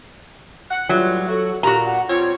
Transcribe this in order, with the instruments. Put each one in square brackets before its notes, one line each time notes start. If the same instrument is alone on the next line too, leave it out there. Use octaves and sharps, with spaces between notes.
[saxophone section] F#5
[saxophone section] A2 E3 G3 [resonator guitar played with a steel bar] F#3 [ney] F4
[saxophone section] F#4 [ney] A4
[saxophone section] A#2 [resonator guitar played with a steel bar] F#4 A#5 [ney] G4
[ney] F#5
[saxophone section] G3 C4 C#5 [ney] F4